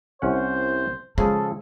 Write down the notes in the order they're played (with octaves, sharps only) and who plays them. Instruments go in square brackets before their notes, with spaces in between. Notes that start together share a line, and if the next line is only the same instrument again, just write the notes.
[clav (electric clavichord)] C2 C#4 F#5 [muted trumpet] C5
[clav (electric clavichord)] C#3 F3 G#4 [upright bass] G#3 [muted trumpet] A4